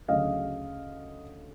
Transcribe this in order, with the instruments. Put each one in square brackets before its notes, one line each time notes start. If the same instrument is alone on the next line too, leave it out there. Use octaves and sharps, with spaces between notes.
[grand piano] D2 C#3 F#3 D#5 F5